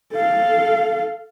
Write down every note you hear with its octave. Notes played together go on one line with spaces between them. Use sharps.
A4 F5